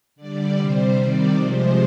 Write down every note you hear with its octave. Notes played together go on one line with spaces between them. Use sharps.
D3 G3 D5
C3 G3 C5
C3 D#3 G3 D5
C3 F3 G#3 C5